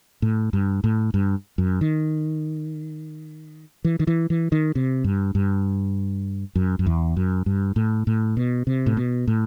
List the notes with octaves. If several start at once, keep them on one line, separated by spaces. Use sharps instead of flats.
A2
G2
A2
G2
F#2
D#3
E3
D#3
E3
E3
D#3
C3
G2
G2
F#2
F#2
E2
F#2
G2
A2
A2
B2
C3
A2
B2
A2